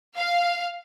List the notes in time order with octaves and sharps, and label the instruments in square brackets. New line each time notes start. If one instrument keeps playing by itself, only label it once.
[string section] F5